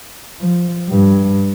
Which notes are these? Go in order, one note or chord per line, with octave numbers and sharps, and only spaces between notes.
F3
G2